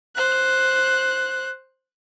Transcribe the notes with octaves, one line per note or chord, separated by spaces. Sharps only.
C5 F#6